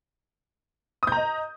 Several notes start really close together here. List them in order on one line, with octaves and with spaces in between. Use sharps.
D#6 G6 A#5 D#5